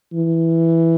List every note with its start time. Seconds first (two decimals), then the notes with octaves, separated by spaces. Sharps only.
0.13 E3